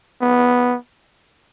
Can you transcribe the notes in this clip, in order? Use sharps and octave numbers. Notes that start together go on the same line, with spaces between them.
B3